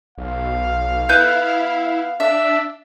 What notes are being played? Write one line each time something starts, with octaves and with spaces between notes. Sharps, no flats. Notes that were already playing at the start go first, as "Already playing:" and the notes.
B1 F5
B3 E4 G6
D4 E5